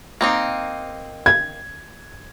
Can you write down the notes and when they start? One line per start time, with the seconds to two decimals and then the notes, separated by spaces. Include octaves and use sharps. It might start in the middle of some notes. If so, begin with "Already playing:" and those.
0.21 A#3 C4 D#4
1.26 G#6